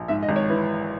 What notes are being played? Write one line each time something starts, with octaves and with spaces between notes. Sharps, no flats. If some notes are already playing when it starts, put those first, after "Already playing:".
Already playing: A#1
G#2 E5
D#5
G#1
C#5
E3 B4